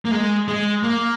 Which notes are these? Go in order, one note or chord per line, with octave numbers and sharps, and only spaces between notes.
A#3
G#3
G#3
A#3